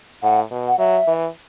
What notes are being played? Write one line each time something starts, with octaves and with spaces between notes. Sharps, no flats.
A2 F#5
B2
F#5
F#3 E5
E3